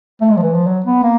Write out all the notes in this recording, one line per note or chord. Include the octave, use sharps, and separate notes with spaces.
A3
G#3
F3
E3
F3
F#3
B3
A#3